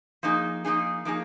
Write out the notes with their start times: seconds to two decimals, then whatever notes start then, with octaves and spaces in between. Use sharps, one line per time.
0.23 F3 A#3 D#4 G#4
0.65 F3 A#3 D#4 G#4
1.05 F3 A#3 D#4 G#4